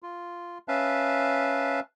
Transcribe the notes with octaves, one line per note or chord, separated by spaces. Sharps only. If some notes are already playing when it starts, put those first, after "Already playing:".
F4
C#4 B4 E5 F5 A5